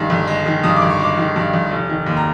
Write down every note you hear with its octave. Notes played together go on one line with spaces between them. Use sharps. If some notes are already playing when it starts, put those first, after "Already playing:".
Already playing: G2 D#3 G#3
G1
G#3
D#3
G2 D#6
D6
G1
C#6
G#3 D6
D#3
G2
G1
F1
D#3
D#2
A#5